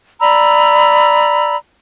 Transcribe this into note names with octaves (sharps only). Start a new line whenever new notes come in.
D5 A#5 B5 E6